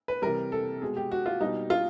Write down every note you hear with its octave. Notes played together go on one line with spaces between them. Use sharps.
B4
C3 E3 G3 A#4
A4
B2 G#3 G#4
G4
F#4
F4
B2 G3 D#4
F4